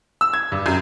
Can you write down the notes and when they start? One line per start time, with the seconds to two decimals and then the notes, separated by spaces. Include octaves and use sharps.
0.21 E6
0.33 G#6
0.52 G2
0.66 F#2